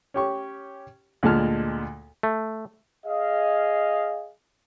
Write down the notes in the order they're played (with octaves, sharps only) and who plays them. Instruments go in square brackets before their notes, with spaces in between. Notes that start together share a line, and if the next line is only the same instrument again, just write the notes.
[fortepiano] C#4 G4 C#6
D2 A#2 G#3 A5 F6
[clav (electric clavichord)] A3
[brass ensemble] G#4 D#5 F5